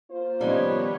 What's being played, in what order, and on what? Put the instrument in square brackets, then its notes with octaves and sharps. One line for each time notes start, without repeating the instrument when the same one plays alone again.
[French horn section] A#3 F4 C5
[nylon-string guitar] D#3 C#4 D#4 [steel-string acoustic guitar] F3 G3 [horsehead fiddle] B3 C#5